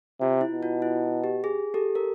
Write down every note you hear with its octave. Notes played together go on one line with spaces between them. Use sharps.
C3 F4
E4
B2
F4
E4
G4
G#4
G4 A4
A#4